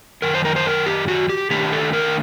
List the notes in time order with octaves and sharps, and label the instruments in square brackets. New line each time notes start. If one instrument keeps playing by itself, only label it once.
[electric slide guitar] F#2 D#3 A#4
C5
A#4
C5
A#4
G4
F#4
G4
D#3 A3 D4 G4
A4
A#4